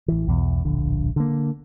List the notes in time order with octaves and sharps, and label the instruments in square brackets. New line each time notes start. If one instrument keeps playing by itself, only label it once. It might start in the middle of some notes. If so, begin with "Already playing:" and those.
[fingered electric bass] A1 E3
B1 E2 B2
D1 A#1 D3
D3 A#3